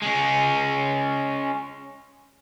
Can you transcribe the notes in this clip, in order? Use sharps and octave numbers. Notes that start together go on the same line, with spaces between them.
G#3 C#4